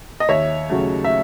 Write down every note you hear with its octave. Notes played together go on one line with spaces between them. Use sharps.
D#5
D#2 C#5 E5
C#3 F#3 A3
E5